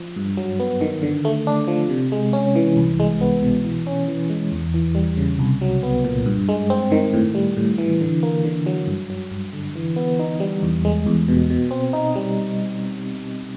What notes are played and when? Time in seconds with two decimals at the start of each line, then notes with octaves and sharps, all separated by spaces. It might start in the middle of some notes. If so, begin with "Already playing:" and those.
Already playing: F3
0.16 G2
0.37 F#3
0.60 B3
0.81 D#3
1.03 D3
1.25 A3
1.47 D4
1.68 F3
1.90 C3
2.12 G#3
2.33 C#4
2.55 E3
2.77 C2
3.00 G#3
3.21 B3
3.43 B2
3.65 E3
3.87 C#4
4.08 E3
4.30 G#3
4.51 E2
4.74 E3
4.95 G3
5.17 C#3
5.39 C2
5.61 F#3
5.83 B3
6.04 A#2
6.26 G2
6.49 G#3
6.70 C4
6.92 D#3
7.14 A2
7.35 G3
7.57 A2
7.78 E3
8.01 D3
8.23 A#3
8.44 D3
8.66 F#3
8.87 G2
9.10 F#3
9.31 G2
9.53 D3
9.75 E3
9.96 B3
10.19 D#4
10.40 G3
10.63 E2
10.85 G#3
11.06 E2
11.28 B2
11.50 B2
11.71 C4
11.93 D#4
12.16 G3